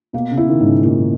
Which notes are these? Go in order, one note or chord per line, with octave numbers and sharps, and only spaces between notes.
B2 A#3
C#3
E4
D#3
G#2
C#3
A#2 E4